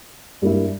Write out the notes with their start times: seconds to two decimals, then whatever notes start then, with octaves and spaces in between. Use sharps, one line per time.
0.42 G2 G3 A#3 E4